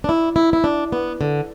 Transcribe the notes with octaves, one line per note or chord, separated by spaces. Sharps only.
D4
E4
E4
E4
D4
B3
D3